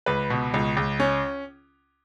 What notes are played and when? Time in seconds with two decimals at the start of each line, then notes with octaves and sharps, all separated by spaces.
0.06 C#2 B4
0.30 B2
0.54 C#2
0.77 C#2
1.00 C#4